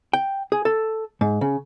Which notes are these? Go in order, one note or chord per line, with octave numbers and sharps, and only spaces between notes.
G5
G#4
A4
G#2
C#3